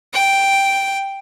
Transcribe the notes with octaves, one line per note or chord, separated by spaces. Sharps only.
G5